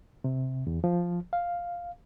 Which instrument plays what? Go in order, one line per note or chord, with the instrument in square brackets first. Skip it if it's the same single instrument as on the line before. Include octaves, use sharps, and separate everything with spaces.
[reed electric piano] C3
E2
F3
F5